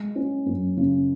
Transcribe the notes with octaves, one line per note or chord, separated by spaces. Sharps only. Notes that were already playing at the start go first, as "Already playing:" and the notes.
Already playing: G#3
C#4
F#2
C#3